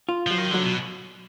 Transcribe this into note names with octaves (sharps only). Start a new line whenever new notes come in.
F4
F3 F#3
D#3
D3 F#3
B2